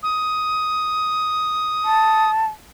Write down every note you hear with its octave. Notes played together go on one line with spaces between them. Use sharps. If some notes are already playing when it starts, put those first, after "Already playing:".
D#6
A5